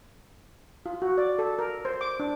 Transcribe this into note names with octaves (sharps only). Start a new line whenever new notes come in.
F4
F#4
D5
A4
A#4
C5
D6
D4